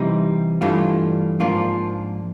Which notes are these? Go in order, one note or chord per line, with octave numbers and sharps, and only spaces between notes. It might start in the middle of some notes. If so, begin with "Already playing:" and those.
Already playing: C3 E3 G3 C4 D#4
G2 E3 A3 D4 F4
G#2 F3 A#3 D4 F4